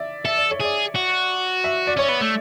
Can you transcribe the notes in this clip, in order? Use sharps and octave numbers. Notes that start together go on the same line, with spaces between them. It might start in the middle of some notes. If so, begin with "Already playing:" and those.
Already playing: D5 E5
A4 E5
D5
C#5
G#4 D5
F#4
E5
D5
C#4 C#5
B3
A3